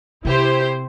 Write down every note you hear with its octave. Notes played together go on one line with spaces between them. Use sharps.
C3 E4 G4 C5